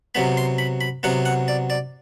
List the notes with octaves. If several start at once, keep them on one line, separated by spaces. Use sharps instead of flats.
C3 F#3 B3 B5
C6
B5
B5
C3 F#3 B3 F#5
F#5
D5
D5